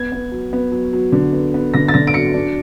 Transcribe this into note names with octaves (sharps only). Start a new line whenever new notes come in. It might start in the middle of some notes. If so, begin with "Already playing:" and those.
Already playing: B3 G#6
B3
F#3
B3
F#3
F#3
D3
B3
B3
D3 A#6
A6
D3 A#6
D7
F#3 C#7
D4